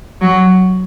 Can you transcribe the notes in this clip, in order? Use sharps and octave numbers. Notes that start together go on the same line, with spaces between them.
F#3